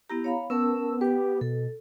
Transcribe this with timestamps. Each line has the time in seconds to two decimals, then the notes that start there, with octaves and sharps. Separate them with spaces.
0.10 B3 E4 G4 A#5
0.24 C#5 F5 B5
0.50 B3 C#4 A#4 A5 E6
1.01 G4 B4 D6
1.41 B2 A4